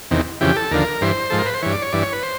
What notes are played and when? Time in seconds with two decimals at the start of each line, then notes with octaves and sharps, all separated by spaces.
0.11 E2 C3 D#3
0.41 F2 C#3 E3 G4
0.56 A4
0.71 D#2 D3 F3 A#4
1.01 G2 E3 C5
1.30 G#2 F3 A4
1.39 A#4
1.46 B4
1.54 C5
1.62 G2 E3 C#5
1.73 D5
1.82 C#5
1.92 G2 E3 D5
2.03 C#5
2.12 B4
2.23 C5